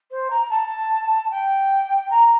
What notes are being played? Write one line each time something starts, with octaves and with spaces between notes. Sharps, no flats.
C5
A#5
A5
G5
A#5